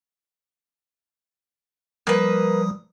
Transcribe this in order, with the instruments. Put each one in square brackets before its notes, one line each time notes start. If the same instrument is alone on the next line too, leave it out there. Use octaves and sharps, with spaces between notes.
[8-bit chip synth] F3 G3 D#6 [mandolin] A#3 B4